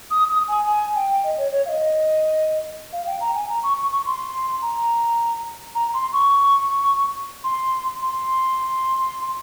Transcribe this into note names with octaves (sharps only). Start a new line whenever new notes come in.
D#6
D#6
G#5
G#5
G5
D#5
C#5
C#5
F5
D#5
F5
G5
A#5
G#5
A#5
C#6
C#6
C#6
C6
A#5
A#5
C6
C#6
C6
C6